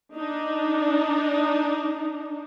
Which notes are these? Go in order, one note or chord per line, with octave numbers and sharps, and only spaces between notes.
D4 D#4